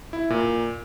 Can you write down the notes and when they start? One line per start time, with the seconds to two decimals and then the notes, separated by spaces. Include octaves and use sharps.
0.13 E4
0.30 A#2